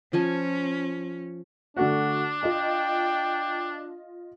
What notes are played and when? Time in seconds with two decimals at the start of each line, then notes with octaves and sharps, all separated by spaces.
0.13 F3 C#4 G#5 A5
1.77 D3 A3 D4 F#4
2.43 F4 D#5 G5